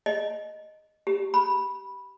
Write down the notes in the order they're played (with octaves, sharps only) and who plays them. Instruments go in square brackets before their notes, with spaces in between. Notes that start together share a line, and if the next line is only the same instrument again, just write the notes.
[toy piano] D#5
G4
B5